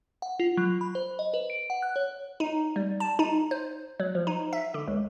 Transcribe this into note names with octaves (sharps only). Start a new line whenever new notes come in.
F#5
F4
F#3
B5
C5
D#5
B4
D7
F#5
F#6
C#5
D#4
G3
A5
D#4
C5
F#3
F3
D#4
E5
D3
C#2